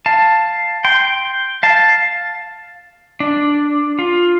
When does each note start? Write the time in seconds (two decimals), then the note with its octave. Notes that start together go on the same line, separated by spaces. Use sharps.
0.06 F5 A5
0.85 G5 C6
1.63 F5 A5
3.20 D4
3.99 F4